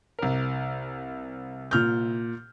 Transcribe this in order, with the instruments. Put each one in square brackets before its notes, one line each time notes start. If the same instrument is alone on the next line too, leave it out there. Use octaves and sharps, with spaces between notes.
[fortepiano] C2 A#4
[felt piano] A#2 F6 G6